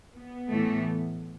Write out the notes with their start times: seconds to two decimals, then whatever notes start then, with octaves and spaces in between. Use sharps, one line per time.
0.15 B3
0.51 A2 E3 A3